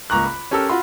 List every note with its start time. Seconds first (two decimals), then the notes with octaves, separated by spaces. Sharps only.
0.10 C#2 A#3 A#5 C#6 D6 F#6
0.25 B5
0.51 C#4 G4 A4 A#4 E6
0.69 F4 F#4 B5 C6